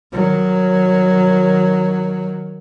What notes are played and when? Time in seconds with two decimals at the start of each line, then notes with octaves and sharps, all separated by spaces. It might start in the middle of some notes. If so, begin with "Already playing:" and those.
0.12 D#3 F#3